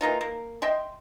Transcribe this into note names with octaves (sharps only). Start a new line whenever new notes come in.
E3 A#3 D#4 F4
A#3
D#5 E5 G5 C6